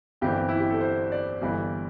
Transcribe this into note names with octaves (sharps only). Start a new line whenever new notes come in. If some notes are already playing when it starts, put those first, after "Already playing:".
G1 G2 E3 G3 C4 G4
E4
G4
A4
C5
D5
G1 G2 E3 G3